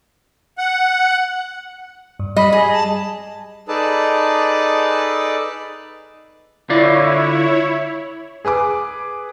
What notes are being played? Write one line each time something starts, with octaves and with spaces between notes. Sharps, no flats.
F#5
G2
G3 D#5 B5
G#4 D#5
A5
D#4 G#4 A4 B4 D5 A5
D3 E4 F4 C#5 D5
G#4 B4 G#5 D6